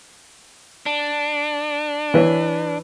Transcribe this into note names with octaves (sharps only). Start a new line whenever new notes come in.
D4
E3 B4 C#5